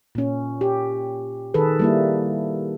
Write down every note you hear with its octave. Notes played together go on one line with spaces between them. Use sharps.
A#2 C#4
G4
D#3 G#4 A4 B4
G3 A#3 E4